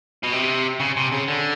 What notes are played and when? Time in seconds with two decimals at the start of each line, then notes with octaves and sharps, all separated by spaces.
0.23 B2
0.33 C3
0.80 C#3
0.96 C3
1.12 C#3
1.28 D3